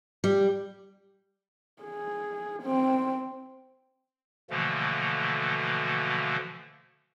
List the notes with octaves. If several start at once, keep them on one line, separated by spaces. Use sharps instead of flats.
G3
G#4
C4
B2 D3 E3 F3 A3 A#3